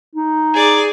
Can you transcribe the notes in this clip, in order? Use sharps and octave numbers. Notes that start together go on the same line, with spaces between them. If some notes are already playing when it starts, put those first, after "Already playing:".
D#4
G#4 D5